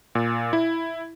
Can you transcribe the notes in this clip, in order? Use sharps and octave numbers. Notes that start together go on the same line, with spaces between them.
A#2
E4